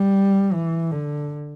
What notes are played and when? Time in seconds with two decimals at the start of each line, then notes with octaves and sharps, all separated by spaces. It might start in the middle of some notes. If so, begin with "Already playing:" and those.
Already playing: G3
0.53 E3
0.91 D3